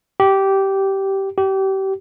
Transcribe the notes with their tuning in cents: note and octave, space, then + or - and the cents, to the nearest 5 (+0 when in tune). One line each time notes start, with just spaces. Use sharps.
G4 -15
G4 -30